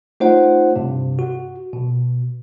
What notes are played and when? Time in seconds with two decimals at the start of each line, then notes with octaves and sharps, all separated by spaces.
0.20 A3 D#4 F4 C5 C#5 F#5
0.76 G2 C3
1.19 F#4
1.73 B2